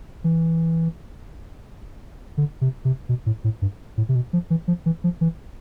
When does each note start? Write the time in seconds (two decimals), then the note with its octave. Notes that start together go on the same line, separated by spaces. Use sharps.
0.24 E3
2.37 D3
2.61 C3
2.85 C3
3.09 B2
3.26 A2
3.44 A2
3.62 G2
3.97 A2
4.09 C3
4.15 B2
4.33 F3
4.50 E3
4.68 F3
4.86 E3
5.04 F3
5.21 E3